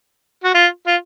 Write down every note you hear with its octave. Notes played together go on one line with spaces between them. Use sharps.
F#4
F4
F4